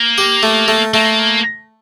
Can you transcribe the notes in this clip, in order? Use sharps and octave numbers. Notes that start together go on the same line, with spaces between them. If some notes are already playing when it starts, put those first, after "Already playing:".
Already playing: A#3
G4
A3
A3
A3 A#3